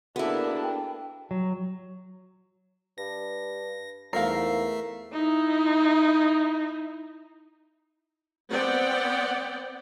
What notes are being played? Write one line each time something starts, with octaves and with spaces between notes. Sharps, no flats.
A#3 B3 D4 E4 F#4 G#4 A4
G5
F#3
G2 A#6
E2 G#2 A3 A#4 E5 F5 C7
D#4 E4
B3 C4 D5 F#5 G5